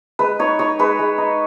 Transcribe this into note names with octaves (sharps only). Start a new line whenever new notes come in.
G#3 B4
D#4 C#5
D#4 C#5
G#3 B4
G#3
D#4